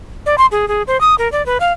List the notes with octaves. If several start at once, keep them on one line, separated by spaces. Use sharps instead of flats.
D5
C6
G#4
G#4
C5
D#6
A#4
D5
B4
F5